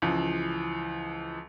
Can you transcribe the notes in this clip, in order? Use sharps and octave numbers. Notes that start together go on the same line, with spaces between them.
C#2 E3 F3